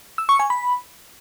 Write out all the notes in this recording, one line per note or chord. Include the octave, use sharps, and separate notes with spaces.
E6
C#6
G#5
B5